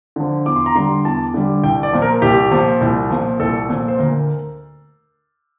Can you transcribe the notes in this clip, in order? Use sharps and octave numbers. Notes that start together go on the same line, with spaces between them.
D3 F3
E2 D6
C6
A#5
D3 G3 C6
E2 A5
D3 G3
C2 G5
D5
A#2 F3
A#4
C2 G4
A#2 F3
C2
A#2 F3
C2 A4
A#2 F3
C5
D2 A#4